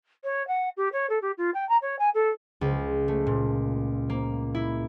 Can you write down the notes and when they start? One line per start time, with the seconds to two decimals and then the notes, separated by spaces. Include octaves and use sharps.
0.24 C#5
0.47 F#5
0.77 G4
0.93 C#5
1.09 A4
1.22 G4
1.38 F4
1.54 G5
1.69 A#5
1.82 C#5
1.99 G#5
2.14 A4
2.61 C#2
3.08 A3
3.27 A#2
4.10 A#3
4.55 E4